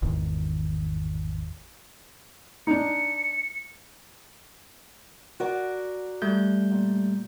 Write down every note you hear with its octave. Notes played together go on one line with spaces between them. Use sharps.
G#1 E2 D#3
D4 D#4 C#7
F#4 A#4 D5
G3 A3 G6
A#2